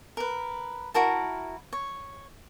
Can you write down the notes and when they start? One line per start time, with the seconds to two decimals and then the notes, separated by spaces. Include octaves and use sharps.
0.17 A#4 B4
0.94 E4 F#4 A#4 A5
1.73 C#5